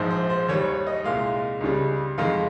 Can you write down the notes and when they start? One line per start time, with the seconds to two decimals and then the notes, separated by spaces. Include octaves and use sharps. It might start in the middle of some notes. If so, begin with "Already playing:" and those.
Already playing: A#1 G#2 F3 G#3 C5
0.10 C5
0.30 C5
0.48 D#2 D#3 G3 C#5
0.67 C#5
0.87 D#5
1.04 C2 A#2 G#3 F5
1.61 C#2 C#3 G3
2.18 F2 D#3 G#3 F5